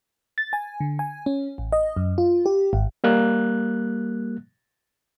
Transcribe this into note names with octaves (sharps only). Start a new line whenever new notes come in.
A6
G#5
D3
G#5
C#4
A1
D#5
F#2
F4
G4
G#1
G3 A#3 F#6